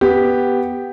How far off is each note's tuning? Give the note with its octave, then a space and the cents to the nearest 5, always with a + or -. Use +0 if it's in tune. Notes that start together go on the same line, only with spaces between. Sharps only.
B3 +0 G4 +0